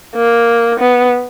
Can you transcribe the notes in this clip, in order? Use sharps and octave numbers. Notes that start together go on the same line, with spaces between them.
A#3
B3